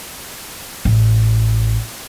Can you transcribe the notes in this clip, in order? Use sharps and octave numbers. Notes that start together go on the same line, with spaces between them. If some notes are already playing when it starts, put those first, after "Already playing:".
A1